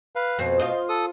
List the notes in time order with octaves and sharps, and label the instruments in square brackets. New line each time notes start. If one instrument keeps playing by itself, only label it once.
[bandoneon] B4 F5
[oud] F2 C5 [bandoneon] B2
[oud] F4 C5 D#5
[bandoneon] A4 D#6